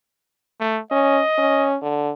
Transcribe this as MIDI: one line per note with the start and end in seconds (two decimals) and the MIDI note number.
0.60 0.80 57
0.91 1.21 61
0.91 1.70 75
1.38 1.76 61
1.82 2.11 50